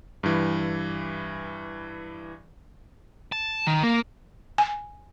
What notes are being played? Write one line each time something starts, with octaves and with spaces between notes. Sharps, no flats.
G2 E3
A5
D#3
A#3
G#5